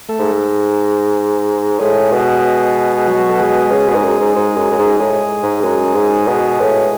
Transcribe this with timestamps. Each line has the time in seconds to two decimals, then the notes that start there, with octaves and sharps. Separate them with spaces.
0.09 A3 A4
0.19 G#2
1.80 A2 G#3 G#4
2.12 B2
2.98 G#4
3.08 F#3 F#4
3.29 A4
3.39 G#3 G#4
3.71 C#3
3.88 B2
3.95 G#2
4.04 F#2
4.20 G#2
4.36 G#2
4.56 F#2
4.71 F#2
4.79 G#2
5.00 A2 G#3 G#4
5.43 G#2
5.64 F#2 G#3 G#4
5.95 G#2
6.28 B2
6.60 A2